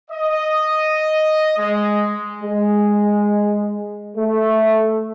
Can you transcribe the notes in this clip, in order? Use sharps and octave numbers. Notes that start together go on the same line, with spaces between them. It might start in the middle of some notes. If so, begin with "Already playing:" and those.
D#5
G#3
G#3
A3